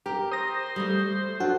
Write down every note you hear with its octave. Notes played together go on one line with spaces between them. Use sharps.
G4 A#4
C5 D#6 A#6
G3 A3
A3
F3 D4 F#4 A4